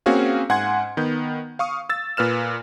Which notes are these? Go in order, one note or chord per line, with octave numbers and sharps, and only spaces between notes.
A#3 C4 C#4 F#4 G#4 F5
G#2 F#5 G#5 C6 G#6
D#3 B3 G6
F5 C#6 D#6
E6 A6
A#2 B4 F6 E7